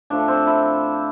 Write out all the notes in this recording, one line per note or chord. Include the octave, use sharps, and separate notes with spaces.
A2 F3 A3 D4
C4
E4